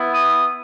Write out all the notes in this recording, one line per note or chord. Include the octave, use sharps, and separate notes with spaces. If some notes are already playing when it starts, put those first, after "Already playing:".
Already playing: B3 E4
D#6